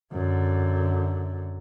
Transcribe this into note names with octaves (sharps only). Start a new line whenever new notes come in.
F#2 D3